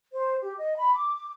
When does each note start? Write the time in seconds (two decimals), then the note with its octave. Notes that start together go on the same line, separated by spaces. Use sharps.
0.13 C5
0.41 G4
0.57 D#5
0.77 B5
0.94 D6